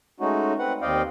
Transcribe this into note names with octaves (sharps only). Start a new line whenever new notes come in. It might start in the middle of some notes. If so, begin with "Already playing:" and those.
G#3 A3 C#4 D#4 F#4
C4 B4 F#5
D#2 C4 D5 D#5 F5 G5